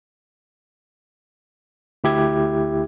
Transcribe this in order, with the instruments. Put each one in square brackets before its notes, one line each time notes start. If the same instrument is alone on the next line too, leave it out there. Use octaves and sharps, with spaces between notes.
[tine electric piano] D2 E4 G4 E5 G#6